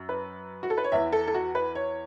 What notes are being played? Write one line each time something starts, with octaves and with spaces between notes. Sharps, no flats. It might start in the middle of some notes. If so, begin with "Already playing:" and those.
Already playing: F#2
B4
F#4
A4
B4
C#5
E2 E3 E5
A4
A4
F#4
B4
C#5